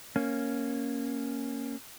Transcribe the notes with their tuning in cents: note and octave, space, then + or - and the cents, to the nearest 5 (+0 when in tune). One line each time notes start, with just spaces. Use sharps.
A#3 +0 C#4 +0